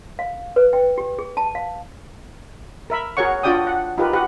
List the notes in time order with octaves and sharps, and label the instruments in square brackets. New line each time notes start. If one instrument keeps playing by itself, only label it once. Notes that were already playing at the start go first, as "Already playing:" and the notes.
[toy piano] F5
B4
G5
G4
G#4
A5
F5
[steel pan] A#4 E5 B5
F#4 G#4 A#4 C#5 F#5 C#6
D4 F4 F#4 D5 G5 D#6
F#5
D#4 F4 G4 A#4 B4
F#4 G4 B4 F#5